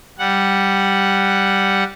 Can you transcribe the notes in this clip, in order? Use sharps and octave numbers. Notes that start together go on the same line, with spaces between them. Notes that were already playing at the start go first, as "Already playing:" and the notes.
G3 F#5